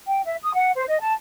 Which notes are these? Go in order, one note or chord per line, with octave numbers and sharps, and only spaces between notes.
G5
E5
D#6
F#5
C5
D#5
A5